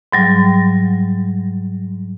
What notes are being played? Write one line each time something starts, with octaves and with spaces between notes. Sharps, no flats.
G#2 F#3 G3